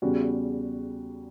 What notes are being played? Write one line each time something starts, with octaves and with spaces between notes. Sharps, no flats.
E2 C#3 G3 C#4 F#4